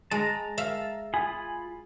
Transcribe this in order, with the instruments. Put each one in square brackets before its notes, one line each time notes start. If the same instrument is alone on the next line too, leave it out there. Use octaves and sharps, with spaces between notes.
[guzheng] G#3 [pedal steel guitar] A5 A#5
[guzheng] E5 F5
[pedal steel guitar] F4 B5 D#6 [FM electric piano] G#5